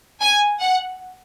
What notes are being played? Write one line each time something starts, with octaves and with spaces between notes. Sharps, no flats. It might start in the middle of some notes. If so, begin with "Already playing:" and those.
G#5
F#5